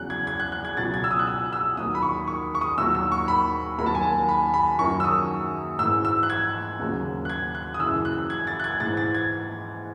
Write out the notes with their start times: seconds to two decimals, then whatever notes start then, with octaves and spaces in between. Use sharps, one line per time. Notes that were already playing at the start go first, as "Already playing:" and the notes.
Already playing: E2 C#3 F#3 F#6
0.10 G#6
0.27 G#6
0.40 F#6
0.52 F#6
0.65 G#6
0.77 C#2 B2 F#3 A6
0.94 G#6
1.04 E6
1.11 D#6
1.19 F#6
1.27 E6
1.53 E6
1.77 D#2 D#3 F#3 D#6
1.95 B5
2.02 C#6
2.27 C#6
2.55 C#6
2.61 D#6
2.78 D#2 D#3 F#3 E6
2.95 E6
3.12 C#6
3.28 B5
3.79 D#2 D#3 F#3 B5
3.86 A5
3.95 G#5
4.03 A5
4.29 B5
4.54 B5
4.79 F#2 D#3 F#3 C#6
5.00 E6
5.04 D#6
5.79 G#2 E3 E6
6.05 E6
6.23 F#6
6.30 G#6
6.79 D#2 C#3 F#3
7.25 F#6
7.30 G#6
7.55 F#6
7.74 D#6
7.80 F#2 C#3 E3 E6
8.05 F#6
8.30 G#6
8.47 A6
8.60 F#6
8.64 G#6
8.80 G#2 E3 A6
8.97 A6
9.15 G#6